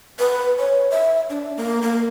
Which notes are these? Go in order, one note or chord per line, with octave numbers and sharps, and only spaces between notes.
B4
C#5
E5
D4
A#3
A#3